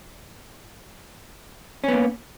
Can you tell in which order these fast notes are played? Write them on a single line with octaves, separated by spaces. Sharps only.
C#4 B3 A#3